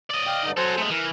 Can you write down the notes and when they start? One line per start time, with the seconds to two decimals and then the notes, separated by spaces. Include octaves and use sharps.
0.11 D5 D#5
0.27 F5 G5
0.44 G2 D3 D#4
0.57 F#3 F#4 A4 C5 G#5
0.78 G#3 A3
0.90 E3 A#4